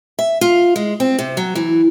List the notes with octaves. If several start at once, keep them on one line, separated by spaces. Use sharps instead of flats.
E5
F4
G#3
C4
C3
F#3
E3